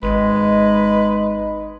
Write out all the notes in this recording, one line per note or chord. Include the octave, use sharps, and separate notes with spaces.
G#1 G#3 D#4 B4